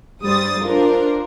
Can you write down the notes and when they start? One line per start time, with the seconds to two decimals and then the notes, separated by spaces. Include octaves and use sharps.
0.21 G2 G3 C5 D#6 A6
0.62 D4 F4 A#4 C5